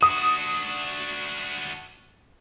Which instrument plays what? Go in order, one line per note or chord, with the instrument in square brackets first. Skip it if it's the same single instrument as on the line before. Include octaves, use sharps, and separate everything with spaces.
[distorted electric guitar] D4 F#4 [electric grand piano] D#6